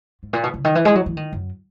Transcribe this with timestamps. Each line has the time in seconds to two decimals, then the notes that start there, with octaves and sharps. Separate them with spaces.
0.23 G#2
0.33 A#2
0.44 B2
0.54 C#3
0.65 D#3
0.75 E3
0.85 G#3
0.95 F#3
1.06 E3
1.17 D#3
1.33 F#2